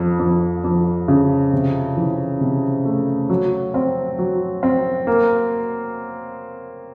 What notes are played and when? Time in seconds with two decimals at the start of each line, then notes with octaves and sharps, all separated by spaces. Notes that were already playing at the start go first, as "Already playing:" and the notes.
Already playing: F2
0.19 F2
0.64 F2
1.08 C#3
1.53 C3
1.97 E3
2.41 C3
2.85 A3
3.30 F#3
3.74 C4
4.18 F#3
4.63 C4
5.07 A#3